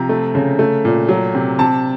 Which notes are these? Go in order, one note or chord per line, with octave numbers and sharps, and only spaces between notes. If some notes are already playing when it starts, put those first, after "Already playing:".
Already playing: C3 F3 A#5
A3
C#3
A3
A#2
F#3
C3
C3 A5